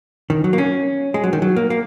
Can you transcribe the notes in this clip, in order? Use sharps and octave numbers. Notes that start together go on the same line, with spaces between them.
D#3
F#3
A#3
C#4
G#3
F#3
D#3
F#3
A#3
A#3